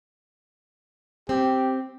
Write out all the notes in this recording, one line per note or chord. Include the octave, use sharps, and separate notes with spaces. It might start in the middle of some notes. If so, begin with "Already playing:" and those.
C4 G4